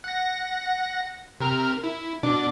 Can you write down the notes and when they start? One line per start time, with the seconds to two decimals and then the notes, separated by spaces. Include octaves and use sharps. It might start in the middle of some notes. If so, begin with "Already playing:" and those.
0.04 F#5 A#6
1.40 C3 A#4 F6
1.84 E4
2.23 B2 D4 D6